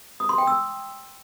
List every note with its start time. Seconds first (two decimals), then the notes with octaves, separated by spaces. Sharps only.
0.20 D#6
0.29 C6
0.38 G5
0.47 E6